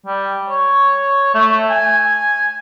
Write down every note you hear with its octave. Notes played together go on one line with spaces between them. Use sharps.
G3
C#5
A3
G#5